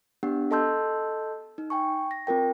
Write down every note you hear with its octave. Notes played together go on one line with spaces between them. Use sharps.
B3 D4 G4 F#5
A4 D#5 A5 C6 E6 G6
D#4
G5 G#5 C#6
A#6
C4 F4 A#4 G5